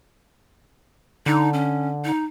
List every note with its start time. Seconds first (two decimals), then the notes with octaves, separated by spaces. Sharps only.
1.26 D3 D#4
1.53 C#4
2.05 D#4